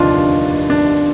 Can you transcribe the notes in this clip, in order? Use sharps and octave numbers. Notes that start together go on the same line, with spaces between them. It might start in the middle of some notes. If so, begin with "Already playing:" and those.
Already playing: F1 D#2 D3 D4 D#4 F4
D4